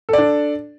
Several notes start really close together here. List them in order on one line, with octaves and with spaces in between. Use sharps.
A4 D5 D4